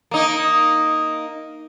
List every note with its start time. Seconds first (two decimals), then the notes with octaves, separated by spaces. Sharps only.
0.11 A#3 D#4